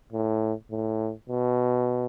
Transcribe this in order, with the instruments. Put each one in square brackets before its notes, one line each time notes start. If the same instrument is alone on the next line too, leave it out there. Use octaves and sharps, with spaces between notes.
[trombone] A2
A2
B2